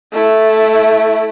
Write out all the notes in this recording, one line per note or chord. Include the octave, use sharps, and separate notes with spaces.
A3 E4